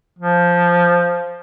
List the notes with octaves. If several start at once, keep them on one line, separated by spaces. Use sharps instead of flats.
F3